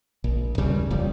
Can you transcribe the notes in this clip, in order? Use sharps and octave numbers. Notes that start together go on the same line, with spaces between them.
A#1
D#2 C#3 G3
D#1 F2 G3